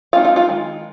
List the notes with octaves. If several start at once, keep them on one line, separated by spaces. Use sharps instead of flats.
G#3 C4 D#4 F4 F5
F4 F5
F4 F5
D#3 G#3